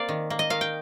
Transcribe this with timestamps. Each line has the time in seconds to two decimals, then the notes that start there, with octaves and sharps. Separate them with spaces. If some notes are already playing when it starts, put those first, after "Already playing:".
Already playing: A#3 C4 D5 F5
0.09 D#3
0.30 A#3
0.39 D#5
0.50 D#3 F5
0.61 G5